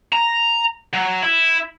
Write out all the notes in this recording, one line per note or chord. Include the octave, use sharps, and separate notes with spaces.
A#5
F#3
E4